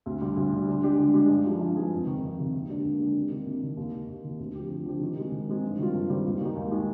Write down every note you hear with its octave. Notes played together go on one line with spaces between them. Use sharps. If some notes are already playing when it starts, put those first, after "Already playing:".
D2
D3 G3
D2
D3 G3
D3
G#3 D4 G4
D3
G#3 D4 G4
G2
F3 G#3 D#4 G#4
G2
F3 G#3 D#4 G#4
F2
C3 D#3
F2
C3 D#3
D#2
D3 G#3 D4 G4
D#2
D3 G#3 D4 G4
C2
C3 D#3 A#3 D4
C2
C3 D#3 A#3 D4
D#2
D#3 A#3
D#2
D#3 A#3
D2
D3 F3 C4 G4
D2
D3 F3 C4 G4
D#3
G#3 C4 D#4
D#3
G#3 C4 D#4
G2
D#3 G3 C4 F4
G2
D#3 G3 C4 F4
D#2
D#3 G#3 D#4
D#2
D#3 G#3 D#4